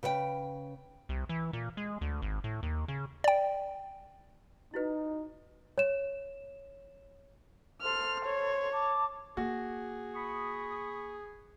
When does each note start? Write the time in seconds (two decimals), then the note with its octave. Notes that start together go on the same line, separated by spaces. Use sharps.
0.03 C#3 B4 C#5 G5
1.09 C2
1.29 E3
1.53 A#2
1.77 G#3
2.01 D2
2.22 G#1
2.44 A2
2.63 D#2
2.88 C#3
3.24 D5 G5
4.74 D#4 E4 F#4 B4
5.78 C#5 E7
7.82 A4 C5 C6 F6
8.24 C#5
8.71 A5 D6
9.37 A#3 F#4 G#4
10.15 B5 C#6 D#6